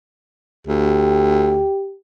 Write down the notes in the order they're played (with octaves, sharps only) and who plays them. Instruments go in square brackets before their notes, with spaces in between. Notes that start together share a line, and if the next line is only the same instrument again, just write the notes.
[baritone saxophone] D2 [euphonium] G4